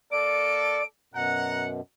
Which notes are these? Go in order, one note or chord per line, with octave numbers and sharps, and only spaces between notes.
A#3 A4 D5 D7
F#2 B2 F#5 A#5